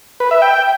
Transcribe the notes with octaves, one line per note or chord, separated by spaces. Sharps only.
B4
E5
G5